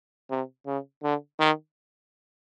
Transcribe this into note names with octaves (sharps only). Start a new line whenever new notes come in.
C3
C#3
D3
D#3